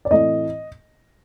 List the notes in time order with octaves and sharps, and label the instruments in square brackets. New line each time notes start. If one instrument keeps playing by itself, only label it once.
[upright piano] D5
A2 E3 A3 C4 D#5